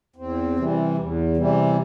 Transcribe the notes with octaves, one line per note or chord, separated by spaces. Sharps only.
E2 C4
C3 E3 G3
E2
C3 E3 G3